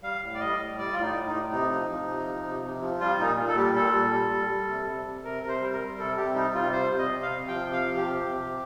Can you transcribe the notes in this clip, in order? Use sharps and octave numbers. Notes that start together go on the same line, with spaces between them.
G3 F5
A2
D5
G3 D#5
A2
G3 D5
A2 F4
D#4
A2
D#4
A2
C3 D#4
F3
F3
C3
F3
C3
C3
F3
G3 F4
A#2 D#4
A#2
A4
G3 G4
A#2 A4
G3
G3
G3
G3
C3
C3
C3
C3 A#4
C3 A#4
C5
G3
A#4
G3
C3 A4
C3 G4
G3 D#4
C3 F4
G3 C5
C3
D#5
C3
F5
C3
F3 G5
C3
F5
F3
G4
C3
C3
C3